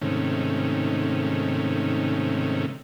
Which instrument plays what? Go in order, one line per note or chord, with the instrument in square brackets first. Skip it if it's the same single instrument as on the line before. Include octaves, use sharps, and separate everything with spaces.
[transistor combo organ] G#2 C3 D#3 A3 C#4